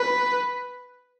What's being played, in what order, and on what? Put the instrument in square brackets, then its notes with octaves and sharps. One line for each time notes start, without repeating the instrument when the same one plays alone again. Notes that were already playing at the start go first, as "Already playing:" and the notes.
Already playing: [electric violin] B4